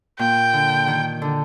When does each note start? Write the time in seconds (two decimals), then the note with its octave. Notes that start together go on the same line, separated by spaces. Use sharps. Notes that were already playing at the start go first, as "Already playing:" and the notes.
0.19 A#2 G5
0.53 D3
0.87 D#3
1.22 D3